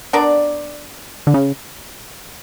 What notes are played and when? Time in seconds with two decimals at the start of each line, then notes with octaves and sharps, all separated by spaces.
0.13 B3 D4 A#4 D5
1.27 D3
1.34 C#3